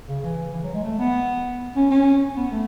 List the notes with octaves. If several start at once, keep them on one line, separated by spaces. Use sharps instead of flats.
C#3
E3
E3
F#3
G#3
A3
B3
C#4
C#4
B3
A3